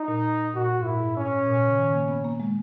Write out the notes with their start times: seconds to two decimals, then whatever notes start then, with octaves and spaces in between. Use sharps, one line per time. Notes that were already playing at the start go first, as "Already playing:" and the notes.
Already playing: D#4
0.08 A#2
0.55 A#2 F#4
0.80 G#2
0.85 A#2 E4
1.00 G#2
1.17 C#4
1.47 A#2
1.58 A#2
1.67 C#3
1.78 D#3
1.94 A#3
2.08 B3
2.24 A#3
2.40 G#3